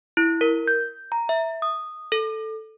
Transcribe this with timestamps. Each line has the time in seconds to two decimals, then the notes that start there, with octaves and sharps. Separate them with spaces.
0.17 E4
0.41 A#4
0.68 G6
1.12 A#5
1.29 E5
1.62 D#6
2.12 A4